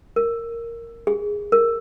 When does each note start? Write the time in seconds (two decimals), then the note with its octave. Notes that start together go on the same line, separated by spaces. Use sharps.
0.16 A#4
1.07 G#4
1.52 A#4